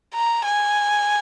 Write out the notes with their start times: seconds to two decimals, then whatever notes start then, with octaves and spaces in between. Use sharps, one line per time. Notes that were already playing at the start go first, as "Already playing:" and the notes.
0.15 A#5
0.45 G#5